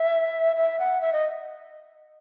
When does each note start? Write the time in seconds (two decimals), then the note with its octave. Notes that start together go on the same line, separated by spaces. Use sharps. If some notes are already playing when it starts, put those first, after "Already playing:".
Already playing: E5
0.56 E5
0.79 F#5
1.01 E5
1.13 D#5